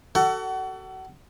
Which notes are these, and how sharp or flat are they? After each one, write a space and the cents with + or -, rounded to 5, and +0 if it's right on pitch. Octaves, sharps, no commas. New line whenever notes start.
F#4 +35 A4 +20 F#5 +30